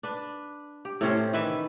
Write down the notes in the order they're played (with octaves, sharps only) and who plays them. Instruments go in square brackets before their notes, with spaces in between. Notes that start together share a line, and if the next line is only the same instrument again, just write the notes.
[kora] D4 B4
G4
A2 C3 C#4 C5
D#3 E3 B4 E5